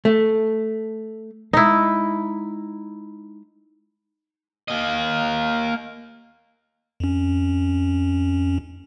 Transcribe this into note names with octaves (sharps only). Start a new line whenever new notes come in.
A3
G#3 D#4 E4
A#3 D#5
F2 C#4